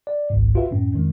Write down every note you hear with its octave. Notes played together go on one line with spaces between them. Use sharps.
D5
G#1 C#2 G#2
F4 F#4 B4 E5
F#2 A2 C#4
F2 D#3 G#3